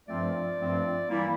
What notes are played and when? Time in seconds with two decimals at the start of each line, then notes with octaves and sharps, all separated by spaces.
0.08 G2 F3 A3 C4 F4 D5
0.59 G2 F3 A3 C4 F4
1.09 E3 G3 A#3 E4